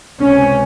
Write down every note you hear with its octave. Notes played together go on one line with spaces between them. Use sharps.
C#2 C3 C#4